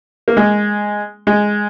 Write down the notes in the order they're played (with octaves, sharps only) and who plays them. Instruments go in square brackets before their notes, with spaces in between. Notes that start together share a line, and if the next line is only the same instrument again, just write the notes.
[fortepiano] A#3
G#3
G#3